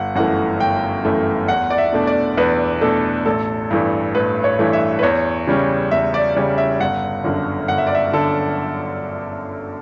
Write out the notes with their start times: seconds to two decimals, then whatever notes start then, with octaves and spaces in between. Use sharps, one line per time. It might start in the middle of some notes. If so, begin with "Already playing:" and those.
Already playing: G1 F#5
0.15 F#2 E3 A3 F#5
0.60 G1 G5
1.05 F#2 E3 A3
1.48 E2 F#5
1.70 D5
1.78 E5
1.93 B2 A3 D4
2.07 D5
2.37 E2 B4
2.81 B2 A3 D4 A4
3.25 A1 A4
3.71 G2 E3 A3
4.15 A1 B4
4.44 C#5
4.59 G2 E3 A3
4.73 E5
4.99 B4
5.03 E2 C#5
5.47 C#3 G3 C#4
5.91 E2 E5
6.14 D5
6.35 C#3 G3 C#4 D5
6.58 E5
6.80 G1 F#5
7.24 F#2 D3
7.68 G1 F#5
7.78 E5
7.87 D5
7.95 E5
8.13 D3 A4